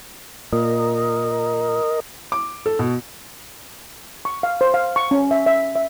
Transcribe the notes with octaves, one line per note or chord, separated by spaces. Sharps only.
A#2 A#4 D#5
D6
A4
B2
C#6
F5
C5
F5
C#6
C#4
E5
E5
E5